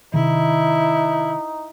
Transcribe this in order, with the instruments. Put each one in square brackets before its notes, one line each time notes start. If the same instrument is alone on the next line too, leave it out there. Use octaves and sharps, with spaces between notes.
[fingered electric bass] C3 D#3 [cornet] D#4 [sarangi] E4